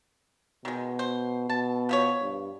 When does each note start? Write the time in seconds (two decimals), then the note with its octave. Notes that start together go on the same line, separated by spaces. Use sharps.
0.65 B2 D#3 G#3
0.99 C5
1.49 B2 A5
1.89 F3 B3 C#5
2.22 G2